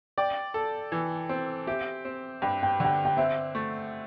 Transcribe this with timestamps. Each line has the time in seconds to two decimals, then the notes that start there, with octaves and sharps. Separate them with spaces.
0.18 D5 G5
0.54 A4
0.92 E3
1.29 C4
1.67 G4 E5
2.05 C4
2.42 G2 G5
2.63 G5
2.80 D3 G5
3.05 G5
3.17 C4 E5
3.55 A3